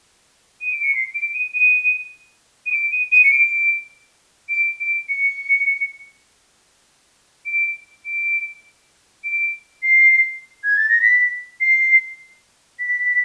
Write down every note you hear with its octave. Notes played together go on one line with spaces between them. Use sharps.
D#7
D7
C#7
C7
D7
D#7
D#7
D#7
D7
D#7
D#7
C#7
D7
D7
D7
C#7
D7
D7
D7
C7
G#6
A6
A#6
B6
C7
B6